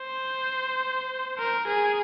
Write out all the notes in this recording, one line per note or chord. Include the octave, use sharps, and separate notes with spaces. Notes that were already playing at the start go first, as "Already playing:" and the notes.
Already playing: C5
A#4
G#4